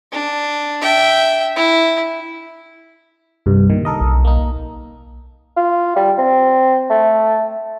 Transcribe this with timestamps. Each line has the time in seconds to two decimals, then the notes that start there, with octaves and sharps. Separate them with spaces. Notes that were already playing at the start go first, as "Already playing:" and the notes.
0.13 D4
0.82 E5 G5
1.56 E4
3.46 C2 G2
3.70 A#2 D#3
3.85 A4 A#4 D#5
4.01 B1
4.25 A#3 D#4
5.57 F4
5.96 G3
6.18 C4
6.90 A3